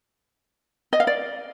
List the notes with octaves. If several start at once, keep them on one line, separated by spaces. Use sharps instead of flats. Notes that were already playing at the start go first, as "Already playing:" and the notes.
D#5
F5
D5